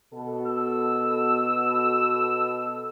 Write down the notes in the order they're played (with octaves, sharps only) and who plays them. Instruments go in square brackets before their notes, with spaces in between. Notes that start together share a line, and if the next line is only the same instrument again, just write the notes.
[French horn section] B2 A4
[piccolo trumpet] E6